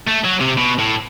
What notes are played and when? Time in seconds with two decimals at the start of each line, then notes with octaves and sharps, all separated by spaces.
0.08 A3
0.25 F#3
0.41 C3
0.58 B2
0.79 A2